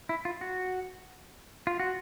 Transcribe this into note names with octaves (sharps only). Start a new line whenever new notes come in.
E4
F4
F#4
F4
F#4